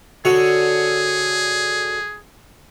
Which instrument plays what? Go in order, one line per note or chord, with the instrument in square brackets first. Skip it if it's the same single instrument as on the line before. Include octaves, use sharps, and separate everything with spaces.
[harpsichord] D3 F#4 C#5 [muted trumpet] G#4